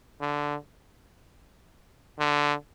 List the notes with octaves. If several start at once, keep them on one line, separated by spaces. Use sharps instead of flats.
D3
D3